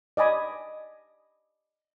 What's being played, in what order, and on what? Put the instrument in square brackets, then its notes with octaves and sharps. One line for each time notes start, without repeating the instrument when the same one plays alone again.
[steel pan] D5 D#5 G#5 B5